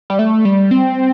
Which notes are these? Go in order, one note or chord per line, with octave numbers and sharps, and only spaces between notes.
G3
A3
G3
C4